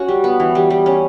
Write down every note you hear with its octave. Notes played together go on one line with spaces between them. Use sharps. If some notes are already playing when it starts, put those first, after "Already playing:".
Already playing: C#4 F#4
G3
B3
E3
G3
G3
C#4